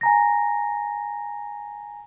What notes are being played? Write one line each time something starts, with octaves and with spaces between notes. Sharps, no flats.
G#5 A#5 A#6